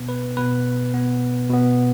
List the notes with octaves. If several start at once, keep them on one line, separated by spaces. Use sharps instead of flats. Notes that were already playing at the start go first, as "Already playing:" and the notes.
Already playing: B2 B3
B4
B2 B3 B4
B2 B3
B2 B3